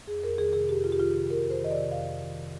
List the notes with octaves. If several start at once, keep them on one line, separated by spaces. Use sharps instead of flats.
F2 G#4
F2 A#4
D#3 G#4
C3 G#4
F2 G4
F2 F4
G4
D#3 F4
C3
F2 A#4
F2
C5
D#3 D#5
D5
C3
F2 F5
F2
D#3
C3